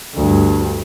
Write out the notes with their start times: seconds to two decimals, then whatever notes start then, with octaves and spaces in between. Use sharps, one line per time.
0.15 D2 G2